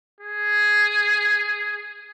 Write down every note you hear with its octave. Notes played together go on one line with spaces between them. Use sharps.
G#4